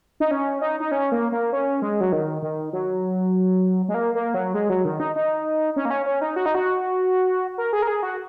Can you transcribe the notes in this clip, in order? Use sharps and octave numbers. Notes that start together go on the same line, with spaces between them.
D#4
C#4
D#4
D#4
C#4
A#3
A#3
C#4
G#3
F#3
D#3
D#3
F#3
G#3
A#3
A#3
F#3
G#3
F#3
D#3
D#4
D#4
C#4
A#3
C#4
C#4
D#4
F#4
D#4
F#4
A#4
G#4
A#4
G#4
F#4